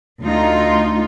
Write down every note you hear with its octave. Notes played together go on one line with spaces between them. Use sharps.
D2 D#4 F4